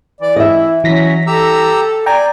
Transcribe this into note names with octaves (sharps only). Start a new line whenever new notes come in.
E3 D5
E4 D#5 E5
E3 F#3 C#4 A#6 B6
G4 A4 A#5 E6
D5 G5 G#5 A#5